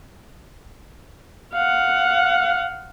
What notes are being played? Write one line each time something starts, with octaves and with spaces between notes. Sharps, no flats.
F5 F#5